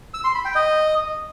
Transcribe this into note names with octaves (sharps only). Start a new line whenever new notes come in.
E6
C6
B5
G5
D#5